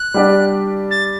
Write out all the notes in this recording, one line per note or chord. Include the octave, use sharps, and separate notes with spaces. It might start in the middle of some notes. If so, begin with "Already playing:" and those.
Already playing: F#6
G3 D4 G4 D5
A6